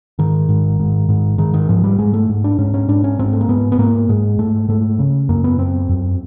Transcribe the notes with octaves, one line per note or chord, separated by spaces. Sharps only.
G#2 D#3
G#2
G#2
G#2
G#2 D#3
D#3
G#2 F3
G3
G#2 G#3
A3
G#2
D4
G#2 C#4
C#4
G#2 D4
C#4
G#2 C4
A3
A#3
G#2 B3
B3
G#2 A#3
G#2 G#3
G#2 A3
G#2 A3
C#3
F#2 A#3
B3
F#2 C4
F#2